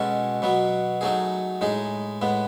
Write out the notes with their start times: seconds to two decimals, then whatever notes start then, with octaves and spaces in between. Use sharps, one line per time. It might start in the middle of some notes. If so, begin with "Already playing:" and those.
Already playing: B2 G#3 C#4 F#4 A4
0.42 B2 F#3 B3
1.01 F#3 A3 D#4 G#4
1.61 A2 G#3 D#4 G#4
2.21 A2 G#3 B3